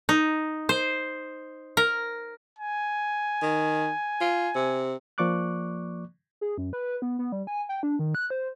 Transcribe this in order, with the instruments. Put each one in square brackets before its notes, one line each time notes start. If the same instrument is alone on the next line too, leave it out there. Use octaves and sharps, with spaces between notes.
[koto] D#4
C5
A#4
[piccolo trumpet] G#5
[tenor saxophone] D#3
F4
C3
[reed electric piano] F3 A#3 D5 C#6 D6 F#6
[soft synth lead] G#4
F#2
B4
B3
B3
G3
G#5
G5
D4
D#3
F#6
C5